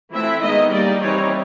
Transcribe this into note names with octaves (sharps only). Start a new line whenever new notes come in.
E3 A3 C4 E4 E5
D#3 G#3 B3 D#4 D#5
G3 A#3 D#4 D5
E3 G3 C4 D#4 C#5